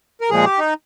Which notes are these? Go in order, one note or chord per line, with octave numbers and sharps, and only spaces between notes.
A#4
A#2 F3 G#3 G#4
G4
D#4